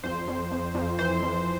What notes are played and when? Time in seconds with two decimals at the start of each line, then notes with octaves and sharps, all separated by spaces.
0.04 F2 C5
0.28 F2
0.51 F2
0.75 F2
0.99 E3 C5
1.22 F2